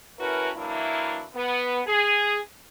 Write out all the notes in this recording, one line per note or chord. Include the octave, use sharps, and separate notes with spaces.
A3 C#4 E4 F#4 A#4 B4
E3 F#3 A#3 D4 E4
B3
G#4